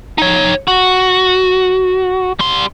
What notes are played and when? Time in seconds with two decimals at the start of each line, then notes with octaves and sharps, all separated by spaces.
0.18 D#4 C#5
0.68 F#4
2.39 G3 C6